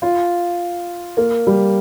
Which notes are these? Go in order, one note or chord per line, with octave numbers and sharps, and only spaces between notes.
F4
A#3
G3